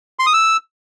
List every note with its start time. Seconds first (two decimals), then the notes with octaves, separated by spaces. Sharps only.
0.19 C6
0.26 D#6
0.33 E6